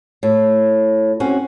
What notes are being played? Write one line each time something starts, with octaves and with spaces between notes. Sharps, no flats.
A2
C4 C#4 F#4